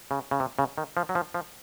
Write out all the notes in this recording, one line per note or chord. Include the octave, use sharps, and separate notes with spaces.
C#3
C#3
C3
C#3
D#3
F3
F#3
F3
F3